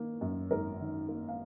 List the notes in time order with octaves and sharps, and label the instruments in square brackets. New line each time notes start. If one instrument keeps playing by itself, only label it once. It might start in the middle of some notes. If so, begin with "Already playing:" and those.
Already playing: [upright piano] D#3 A#3
F#2
G#1 A#4
D#3
A#3
F5